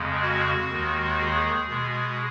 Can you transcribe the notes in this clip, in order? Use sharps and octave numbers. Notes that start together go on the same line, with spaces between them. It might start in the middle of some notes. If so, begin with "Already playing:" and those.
Already playing: F2 C#3 G#3
F#4
D#2 D#3 G#3
G#4
B2 G#3